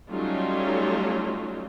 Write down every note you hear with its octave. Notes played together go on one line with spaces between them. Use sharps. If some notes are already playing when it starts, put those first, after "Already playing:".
F#3 G3 A3 C#4 D#4 F4